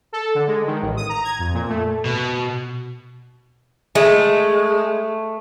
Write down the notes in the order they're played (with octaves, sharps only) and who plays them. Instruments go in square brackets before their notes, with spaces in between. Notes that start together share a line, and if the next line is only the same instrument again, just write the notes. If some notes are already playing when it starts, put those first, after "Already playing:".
[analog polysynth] A4
D3
G#3
D#3
A1
D#6
A#5
G#6
F2
A#2
A3
[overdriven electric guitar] B2
[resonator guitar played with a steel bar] G#3 [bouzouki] A3